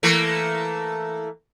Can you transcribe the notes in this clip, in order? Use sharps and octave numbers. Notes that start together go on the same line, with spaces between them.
E3 A3 A#3